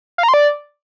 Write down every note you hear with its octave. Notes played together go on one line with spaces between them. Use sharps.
F5
A#5
C6
D5